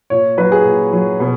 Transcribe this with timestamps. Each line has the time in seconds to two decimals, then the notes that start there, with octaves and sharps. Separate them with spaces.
0.10 A#2 C#5
0.37 F#3 B4
0.52 G#4
0.65 A#2
0.93 F#3
1.20 B2